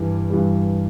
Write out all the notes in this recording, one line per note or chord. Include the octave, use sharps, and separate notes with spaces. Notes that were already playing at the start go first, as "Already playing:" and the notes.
Already playing: G2 E3 G3
G2 E3 G3